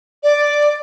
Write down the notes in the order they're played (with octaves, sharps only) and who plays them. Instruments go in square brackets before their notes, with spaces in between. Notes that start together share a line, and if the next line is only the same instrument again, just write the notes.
[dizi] D5